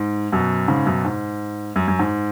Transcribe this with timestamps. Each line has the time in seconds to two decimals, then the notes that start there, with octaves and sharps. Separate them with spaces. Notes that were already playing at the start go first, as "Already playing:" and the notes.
Already playing: G#2
0.32 F#2 B2
0.68 G#2 C#3
0.86 F#2 B2
1.05 G#2
1.76 F#2
1.88 F#2
1.99 G#2